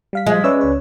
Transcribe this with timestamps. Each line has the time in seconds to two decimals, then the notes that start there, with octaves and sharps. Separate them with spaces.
0.13 G3 F5 B6
0.26 F3 G#3
0.44 C#4 B4 C#5 D5 E5 E6
0.61 C#2 C#5